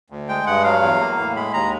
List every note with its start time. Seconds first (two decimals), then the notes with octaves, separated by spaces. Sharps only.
0.10 D2
0.29 G#3 G5
0.47 G2 F#5
0.64 F#3 F5
0.82 E2
1.01 A#3
1.18 A2
1.36 G#3 B5
1.54 D#2 A#5